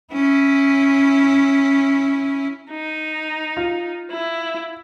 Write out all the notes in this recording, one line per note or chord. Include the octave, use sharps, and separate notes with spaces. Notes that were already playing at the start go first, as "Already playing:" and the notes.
C#4 E4
D#4
F4
E4